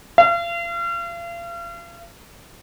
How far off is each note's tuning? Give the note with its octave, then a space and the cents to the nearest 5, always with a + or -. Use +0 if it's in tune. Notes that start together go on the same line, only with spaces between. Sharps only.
F5 -40